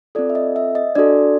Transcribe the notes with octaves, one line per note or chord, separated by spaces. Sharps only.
C4 F4 A4 D5
E5
D#5
E5
D#5
D4 F#4 A4 D5